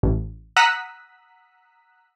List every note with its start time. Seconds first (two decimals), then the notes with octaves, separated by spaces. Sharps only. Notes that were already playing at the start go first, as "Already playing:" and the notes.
0.03 A1
0.56 F#5 A#5 D#6 E6 F#6 B6